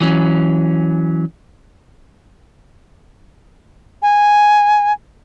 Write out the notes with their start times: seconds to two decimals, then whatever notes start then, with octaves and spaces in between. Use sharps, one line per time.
0.01 E3 F#3 C#4
4.02 G#5